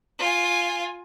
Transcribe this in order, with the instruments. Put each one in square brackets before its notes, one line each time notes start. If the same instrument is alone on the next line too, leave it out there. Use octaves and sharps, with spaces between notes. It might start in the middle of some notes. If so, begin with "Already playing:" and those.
[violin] F4 G#5